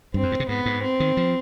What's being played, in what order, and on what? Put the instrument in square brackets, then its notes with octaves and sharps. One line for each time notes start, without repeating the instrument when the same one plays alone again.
[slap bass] G2 [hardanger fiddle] C4
[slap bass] F2
G2
C3
[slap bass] G#2 [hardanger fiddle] B3
[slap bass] G#2
[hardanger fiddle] C4
[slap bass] D#3
F3